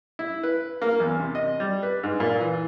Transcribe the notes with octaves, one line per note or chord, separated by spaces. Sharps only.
E4
B4
A#3
E2
C3
D#5
G3
B4
G#2
A#2
E3